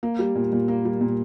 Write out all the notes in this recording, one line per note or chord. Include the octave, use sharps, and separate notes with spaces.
A#3
G3
A#2
A#2
A#3
G3
A#2